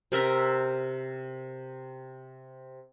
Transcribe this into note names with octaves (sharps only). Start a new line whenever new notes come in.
C3 A#4 E5 A#5